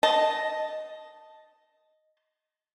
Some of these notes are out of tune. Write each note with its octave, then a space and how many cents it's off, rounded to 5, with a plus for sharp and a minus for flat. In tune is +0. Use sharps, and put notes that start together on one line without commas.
D#5 +0 A5 +0